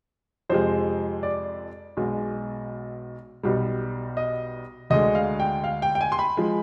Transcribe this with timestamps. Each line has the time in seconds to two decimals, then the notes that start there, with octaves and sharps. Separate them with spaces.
0.50 F2 C3 F3 G#3 C5
1.23 D5
1.97 B1 B2 G#3
3.43 B1 B2 G3
4.17 D#5
4.90 D2 D3 G#3 D#5
5.15 F5
5.40 G5
5.64 F5
5.82 G5
5.95 G5
6.01 G#5
6.12 C6
6.19 B5
6.37 F3 G#3